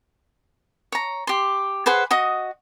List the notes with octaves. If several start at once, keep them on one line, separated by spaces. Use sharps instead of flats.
C#5 A#5
G4 C6
G#4 B4 C5 F#5
F#4 D#5 D#6